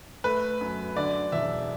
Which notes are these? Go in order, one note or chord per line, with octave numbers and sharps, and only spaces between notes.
A3 B4
F#2
D3 D5
E1 E5